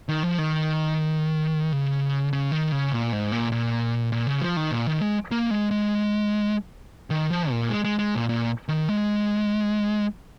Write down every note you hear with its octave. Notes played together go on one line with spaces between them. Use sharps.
D#3
F3
D#3
C#3
C#3
D#3
C#3
A#2
G#2
A#2
A#2
A#2
C#3
F3
D#3
A#2
D#3
G#3
A#3
G#3
G#3
D#3
F3
A#2
G#3
G#3
G#3
A#2
A#2
D#3
G#3